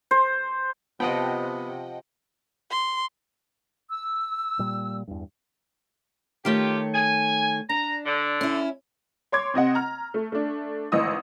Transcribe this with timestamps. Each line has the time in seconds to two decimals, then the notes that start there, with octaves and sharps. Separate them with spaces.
0.11 C5
1.00 C3 F3 B3 D#5 F#5 G5
2.71 C6
3.89 E6
4.59 A#2 G3
5.08 E2 G2
6.45 D#3 A3 F4 G4 C#5
6.94 G#5
7.69 D4 A#5
8.05 D3
8.41 C#4 E4
9.32 C#5 C6 D6 G#6
9.54 C3 C4 D#5 F#5
9.75 A#5 F6
10.14 A3
10.32 A3 D4
10.92 G#1 D2 E3 D#5 D#6 E6